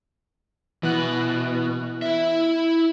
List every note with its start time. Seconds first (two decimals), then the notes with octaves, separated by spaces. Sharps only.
0.83 B2 E3 B3 F#6
2.02 E4 E5